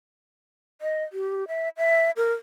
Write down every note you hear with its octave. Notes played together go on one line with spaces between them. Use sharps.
D#5
G4
E5
E5
A#4